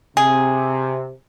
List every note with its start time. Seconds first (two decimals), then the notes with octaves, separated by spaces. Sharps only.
0.17 C3 G#4